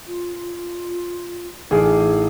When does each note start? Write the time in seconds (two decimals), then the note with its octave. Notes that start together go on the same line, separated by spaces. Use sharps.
0.06 F4
1.71 A1 D#4 F4 G#4 D6